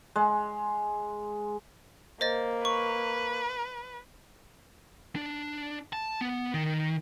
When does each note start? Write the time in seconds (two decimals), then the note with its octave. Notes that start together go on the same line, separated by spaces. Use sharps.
0.16 G#3
2.21 A#3 C5 D#5 A6
2.65 B4 C#6
5.16 D4
5.93 A5
6.21 B3
6.54 D#3